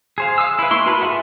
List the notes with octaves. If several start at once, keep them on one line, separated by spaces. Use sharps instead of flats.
G#4 C5 F5
F5 D#6 E6
E4 B4
G#3 A#3 E4 C6 C#6
F#4 A#4 B4 A5 B5
F4 G#4 A4 E5 F#5